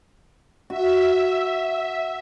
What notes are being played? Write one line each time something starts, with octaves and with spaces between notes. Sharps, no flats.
F#4 E5